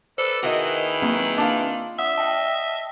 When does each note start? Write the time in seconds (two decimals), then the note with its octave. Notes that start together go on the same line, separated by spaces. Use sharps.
0.18 A4 B4 C5 D5 E6
0.43 D#3 E4 F#4 G#4 A#4 B4 D#5
1.02 F#3 A#3 C4
1.38 D4 F4 F5
1.99 E5 F#5 D#6
2.18 D#5 G5 A5